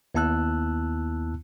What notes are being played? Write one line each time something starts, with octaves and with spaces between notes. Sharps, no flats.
D#2 B3 E4 A5 E6 F#6